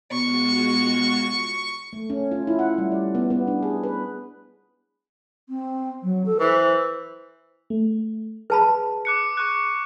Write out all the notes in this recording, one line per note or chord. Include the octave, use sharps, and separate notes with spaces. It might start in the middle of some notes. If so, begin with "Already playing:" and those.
B2 G#3 F4 F#4 C#6
A3
C#4
F4
E4
F#5
G3
D5
B3
B3
D4
G#4
B4
C4
F#3
A4
E3 C5
A3
G#4 B4 A5 B5
D6 F#6 C#7
C#6 F#6